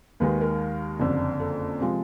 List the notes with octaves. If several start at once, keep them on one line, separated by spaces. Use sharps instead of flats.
D#2 D#3 G#3 B4
A#4
F#1 F2 D3
A4
C3 F3 G#3